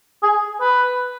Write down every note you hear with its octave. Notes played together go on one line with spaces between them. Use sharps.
G#4
B4